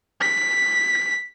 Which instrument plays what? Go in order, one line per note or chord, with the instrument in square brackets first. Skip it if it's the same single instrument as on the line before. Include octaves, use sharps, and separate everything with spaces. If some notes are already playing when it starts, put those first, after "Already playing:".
[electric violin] B6